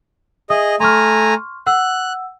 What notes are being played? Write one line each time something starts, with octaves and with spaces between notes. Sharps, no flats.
G#4 D#5 E5 D#6
A3 G#5 A#5 C6 C#6 F6
F#5 E6 F#6